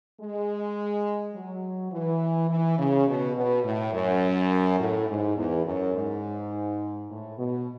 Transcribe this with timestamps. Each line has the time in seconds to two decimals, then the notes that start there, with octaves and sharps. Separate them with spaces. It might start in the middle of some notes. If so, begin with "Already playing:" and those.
0.20 G#3
1.34 F#3
1.92 E3
2.49 E3
2.78 C#3
3.07 B2
3.36 B2
3.64 A2
3.93 F#2
4.79 A2
5.07 G#2
5.37 E2
5.65 F#2
5.94 G#2
7.08 A2
7.37 B2